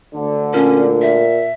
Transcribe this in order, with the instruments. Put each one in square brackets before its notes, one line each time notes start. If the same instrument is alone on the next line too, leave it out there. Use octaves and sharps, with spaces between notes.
[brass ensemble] D2 D3
[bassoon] A#2 [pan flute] C#4
[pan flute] E5